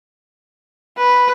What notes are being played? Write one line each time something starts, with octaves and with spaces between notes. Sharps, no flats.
B4